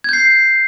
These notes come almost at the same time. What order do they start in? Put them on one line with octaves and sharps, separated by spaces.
G#6 G6 C7